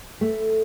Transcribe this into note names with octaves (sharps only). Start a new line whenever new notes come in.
A3